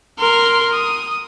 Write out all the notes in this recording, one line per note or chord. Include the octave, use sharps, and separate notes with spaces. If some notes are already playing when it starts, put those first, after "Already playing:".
A#4 C6
D#6